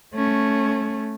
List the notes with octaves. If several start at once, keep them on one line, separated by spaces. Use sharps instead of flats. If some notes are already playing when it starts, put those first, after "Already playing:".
A3 C#4